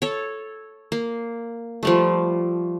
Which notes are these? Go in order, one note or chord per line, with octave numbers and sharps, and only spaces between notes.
A4 C#5
A#3
F3 G3 A3